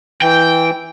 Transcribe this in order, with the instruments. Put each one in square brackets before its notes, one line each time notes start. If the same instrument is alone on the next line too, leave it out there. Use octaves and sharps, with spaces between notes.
[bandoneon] E3 [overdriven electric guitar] G5